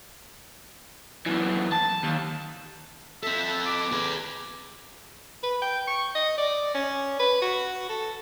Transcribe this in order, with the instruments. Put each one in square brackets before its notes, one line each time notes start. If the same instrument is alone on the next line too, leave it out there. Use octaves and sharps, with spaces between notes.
[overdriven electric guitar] F#2 E3
A5
D#2
[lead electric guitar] C4 A4 [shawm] E5
[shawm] D6
[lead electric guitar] G#4 B4
[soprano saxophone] B4
G5
C#6
D#5
D5
C#4
B4
F#4
A4